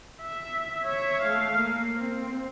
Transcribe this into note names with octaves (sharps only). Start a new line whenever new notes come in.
E5
C#5 E5
A3 F5
A#3
C4